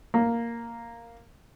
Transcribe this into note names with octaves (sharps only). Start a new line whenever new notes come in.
A#3